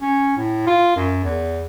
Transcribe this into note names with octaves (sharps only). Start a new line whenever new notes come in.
C#4
A2
F4
F#2
E2